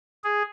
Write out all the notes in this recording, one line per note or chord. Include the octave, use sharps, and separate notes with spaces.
G#4